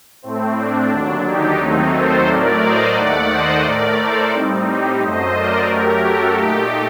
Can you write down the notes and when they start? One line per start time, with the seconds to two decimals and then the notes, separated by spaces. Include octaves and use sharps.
0.22 A2 A3 C4
0.56 D4
0.90 D#2 D3 F#3
1.25 D#4 G4
1.59 D#2 D#3 F#3 A3 C4 D#4
1.93 A4 C5
2.27 A2 F#3 A3 A#4 D5
2.62 C5 D#5
2.96 D#2 D#3 A3 D5 F#5
3.30 C5 D#5
3.65 A2 A3 A#4 D5
3.99 A4 C5
4.33 A2 G3 C4 D#4
4.67 D#4 G4
5.01 F#2 F#3 A3 C5 D#5
5.36 A#4 D5
5.70 F#2 F#3 A3 G4 A#4
6.04 F#4 A4
6.38 A#2 A3 D#4 G4